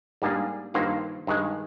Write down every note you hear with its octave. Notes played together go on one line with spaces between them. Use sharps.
G#2 G3 A#3 D4 G#4
G2 D#3 A#3 F4 C5
G2 D#3 G#3